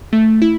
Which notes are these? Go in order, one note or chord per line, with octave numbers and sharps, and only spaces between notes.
A3
E4